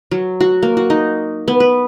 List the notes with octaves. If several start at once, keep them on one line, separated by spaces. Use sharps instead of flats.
F#3
F#4
A#3
F#4
D#4
B3
B4